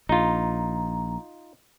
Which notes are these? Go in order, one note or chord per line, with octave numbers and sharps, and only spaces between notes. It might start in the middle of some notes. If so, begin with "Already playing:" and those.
A#1 D#4 F4 A#5